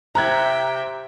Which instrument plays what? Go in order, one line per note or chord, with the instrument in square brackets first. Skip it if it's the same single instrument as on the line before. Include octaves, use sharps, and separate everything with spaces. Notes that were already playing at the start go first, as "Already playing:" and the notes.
[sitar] C3 [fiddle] E5 G5 [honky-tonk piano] A#5 F#6 G#6